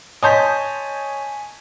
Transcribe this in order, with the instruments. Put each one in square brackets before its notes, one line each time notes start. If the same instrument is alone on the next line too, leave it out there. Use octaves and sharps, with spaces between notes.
[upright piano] C#5 A5 G6 [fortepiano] D#5 C6 [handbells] G#5 B6